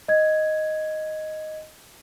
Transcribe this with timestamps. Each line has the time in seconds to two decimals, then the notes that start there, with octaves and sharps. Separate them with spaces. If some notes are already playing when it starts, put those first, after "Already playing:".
0.08 D#5 G#6